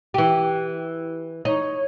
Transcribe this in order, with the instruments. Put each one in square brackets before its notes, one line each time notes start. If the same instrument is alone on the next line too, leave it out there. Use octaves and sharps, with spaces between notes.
[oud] E3 G4
[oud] D#4 [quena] C#5